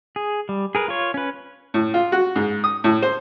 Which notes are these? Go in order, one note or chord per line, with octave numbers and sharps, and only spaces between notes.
G#4
G3
G#4 A#4 B4
F4 C#5
C#4 B4
A2
F4
F#4
G#2
D#6
A2
C5